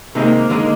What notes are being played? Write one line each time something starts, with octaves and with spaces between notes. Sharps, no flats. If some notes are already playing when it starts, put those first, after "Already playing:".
C3 D#3 G#3 A#3 C4 D#4
D#2 D3 G#3 D#4